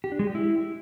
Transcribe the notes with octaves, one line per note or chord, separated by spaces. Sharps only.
G4
D4
G#3
G4
E4